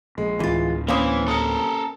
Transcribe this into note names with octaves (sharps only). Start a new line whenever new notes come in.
A#1 G#3
D1 G1 E3 F4
E3 A#3 C#4 C5 F5 D6 D#6
A4 A#4 D#6 C#7